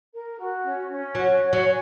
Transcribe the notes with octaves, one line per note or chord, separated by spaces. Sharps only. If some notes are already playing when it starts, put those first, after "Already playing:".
A#4
F#4
C#4
C#4
F#3 F#4
C#5
F#3
G#5